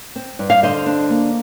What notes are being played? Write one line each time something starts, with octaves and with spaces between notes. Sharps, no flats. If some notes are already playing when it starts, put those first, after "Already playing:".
C4
G2
F5
D3 C5 D#5
D4
A#3